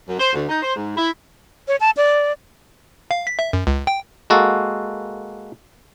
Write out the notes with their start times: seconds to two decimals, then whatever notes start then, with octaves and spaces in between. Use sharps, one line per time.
0.07 F#2
0.19 C5
0.33 D2
0.49 D#4
0.62 C5
0.75 G#2
0.97 E4
1.68 C#5
1.80 A5
1.97 D5
3.11 F5
3.27 B6
3.39 E5
3.53 F#2
3.67 C#2
3.87 G5
4.30 G#3 A#3 F#4 A4